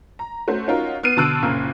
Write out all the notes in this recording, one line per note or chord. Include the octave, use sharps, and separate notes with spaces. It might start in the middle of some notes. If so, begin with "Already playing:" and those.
A#5
A3 C#4 F#4 C5
C#4 D#4 F4 F#4 A#4
B3 F6 C7 D#7
B2 D3 A5 E6 F#6 D7
F#1 A#2 C#3 A#3